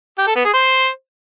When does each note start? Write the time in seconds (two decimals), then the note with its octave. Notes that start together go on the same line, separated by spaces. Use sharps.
0.18 G4
0.27 A4
0.36 B3
0.45 G#4
0.54 C5